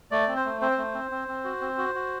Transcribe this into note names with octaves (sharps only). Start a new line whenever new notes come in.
A3 D5
C4
C5
A3
C4 C5
A3
C4
C4
C4
F#4
C4
F#4
F#4